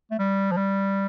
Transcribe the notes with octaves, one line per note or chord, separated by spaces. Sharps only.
A3
G3
F3
G3